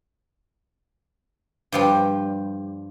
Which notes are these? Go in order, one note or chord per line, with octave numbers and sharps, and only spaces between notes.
G2 F3 G3